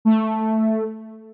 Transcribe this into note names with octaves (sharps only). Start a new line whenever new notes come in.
A3